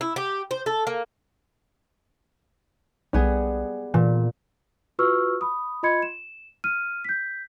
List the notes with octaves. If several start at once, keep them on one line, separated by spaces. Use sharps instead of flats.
E4
G4
C5
A4
A#3
B1 G3 B3 G#4
A#2 E3
F4 F#4 B4 C#6 E6 F6
B5 D#6
F4 D#5 B5 C6 G#6 C#7
E7
F6 D#7
G6 B6